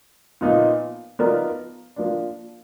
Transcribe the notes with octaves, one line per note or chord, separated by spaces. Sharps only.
A#2 F3 B3 D#4
F3 B3 D#4 A#4 D5
F3 A#3 D4